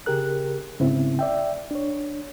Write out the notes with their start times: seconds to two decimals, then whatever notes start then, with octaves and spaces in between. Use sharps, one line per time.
0.06 C#3 G4 G#4 A#4 F#6
0.80 G#2 C#3 B3 C4 E4
1.19 D5 E5 G5
1.71 D4 C#5